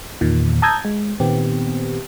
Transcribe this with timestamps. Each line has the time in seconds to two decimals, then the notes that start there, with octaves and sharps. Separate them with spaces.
0.21 E2 A#2 D#3
0.62 A5 A#5 D#6 E6 G6 G#6
0.85 G#3
1.20 A#2 D#3 B3 C4 G4